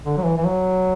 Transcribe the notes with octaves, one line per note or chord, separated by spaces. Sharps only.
D3
F#3
E3
E3
F#3